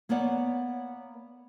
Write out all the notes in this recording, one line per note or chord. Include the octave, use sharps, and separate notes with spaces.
A#3 B3 C#5 D5 F#5